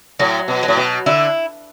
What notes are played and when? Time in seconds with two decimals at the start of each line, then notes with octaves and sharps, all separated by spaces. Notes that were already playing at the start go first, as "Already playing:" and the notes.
0.20 A2 F#3
0.48 B2
0.63 F#3
0.68 A2
0.77 B2
1.06 D3 E4